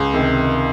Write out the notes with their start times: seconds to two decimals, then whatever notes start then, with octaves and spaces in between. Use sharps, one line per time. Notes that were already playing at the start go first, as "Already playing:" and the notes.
Already playing: C#2
0.14 C3 D#3